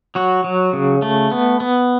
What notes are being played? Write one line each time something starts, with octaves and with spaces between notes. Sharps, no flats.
F#3 F#4
F#3
C#3
A3
B3
B3